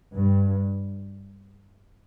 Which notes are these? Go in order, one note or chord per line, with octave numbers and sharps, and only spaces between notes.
G2